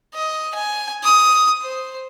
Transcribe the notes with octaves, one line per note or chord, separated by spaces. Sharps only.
D#5
G#5
D#6
C5